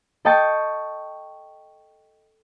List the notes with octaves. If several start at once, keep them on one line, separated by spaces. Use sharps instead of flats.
A4 D#5 G5 A5 C#6 A6